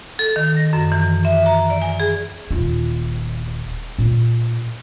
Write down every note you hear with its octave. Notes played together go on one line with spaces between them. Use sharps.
A4
D#3
A#6
F#2
E3
E5
A#5
D5
G#5
G#4
D#1 F4
A#2